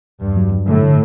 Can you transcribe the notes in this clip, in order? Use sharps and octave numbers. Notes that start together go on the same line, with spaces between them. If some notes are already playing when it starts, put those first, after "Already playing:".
E2 G2
F#3
F#3
A2 D3
D3